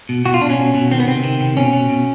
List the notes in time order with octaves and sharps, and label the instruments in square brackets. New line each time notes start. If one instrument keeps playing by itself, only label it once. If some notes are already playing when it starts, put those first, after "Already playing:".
[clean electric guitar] B2
B2 F#4
F4
B2 D4
C#4
B2
B2
D#3 C4
B3
C3 C4
D#3
C3
B2 C#4
B2
B2